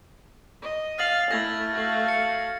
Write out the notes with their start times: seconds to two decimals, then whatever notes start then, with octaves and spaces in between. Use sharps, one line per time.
0.62 D#5
0.99 F5 F6 A6 F#7
1.31 A3 E4 G#6 A#6
1.73 F#4 F5
2.08 C#7